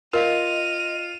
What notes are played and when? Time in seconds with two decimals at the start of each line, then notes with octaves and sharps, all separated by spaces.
0.13 F4 A#4 D#5 F5 D#7 F7